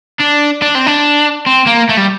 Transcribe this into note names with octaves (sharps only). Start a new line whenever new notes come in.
D4
D4
C4
D4
C4
A#3
A3
G3